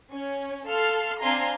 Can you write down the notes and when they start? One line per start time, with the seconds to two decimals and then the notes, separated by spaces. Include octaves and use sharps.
0.12 C#4
0.68 A4 F5 A5 C6 F6
1.21 C4 D4 F5 G#5 A#5 C6